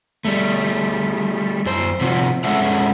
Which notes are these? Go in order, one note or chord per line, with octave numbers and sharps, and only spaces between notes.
G3 A3
F#2 C5
C3 F3 F#4
G#3 C#4 A4 E5 F#5